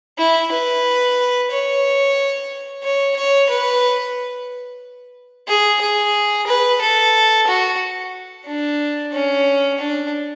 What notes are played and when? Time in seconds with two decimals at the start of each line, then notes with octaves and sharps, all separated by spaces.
0.18 E4
0.52 B4
1.51 C#5
2.83 C#5
3.16 C#5
3.50 B4
5.48 G#4
5.81 G#4
6.47 B4
6.81 A4
7.47 F#4
8.46 D4
9.13 C#4
9.79 D4